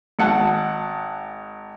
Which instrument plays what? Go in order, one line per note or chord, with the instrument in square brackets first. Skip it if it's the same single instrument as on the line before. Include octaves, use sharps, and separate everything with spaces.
[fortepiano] G#1 F#5 A5